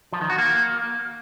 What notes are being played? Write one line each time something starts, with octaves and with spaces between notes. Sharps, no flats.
F3
D#3
F#4
A#3